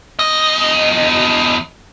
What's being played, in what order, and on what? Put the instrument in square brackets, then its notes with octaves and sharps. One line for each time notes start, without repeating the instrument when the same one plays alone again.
[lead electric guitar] E2 D#5